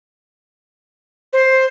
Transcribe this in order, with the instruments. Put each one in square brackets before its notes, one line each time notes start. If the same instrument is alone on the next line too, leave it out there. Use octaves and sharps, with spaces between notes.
[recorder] C5